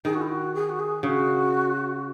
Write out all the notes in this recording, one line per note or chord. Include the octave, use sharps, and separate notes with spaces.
D#3 G#4
F#4
E4
F#4
G#4
F#4
G#4
C#3 F#4